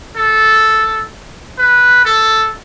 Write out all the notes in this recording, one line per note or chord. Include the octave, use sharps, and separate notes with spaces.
A4
B4
A4